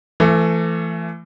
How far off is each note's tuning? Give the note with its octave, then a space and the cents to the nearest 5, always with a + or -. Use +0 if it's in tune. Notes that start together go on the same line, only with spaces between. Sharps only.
E3 +35 A3 +10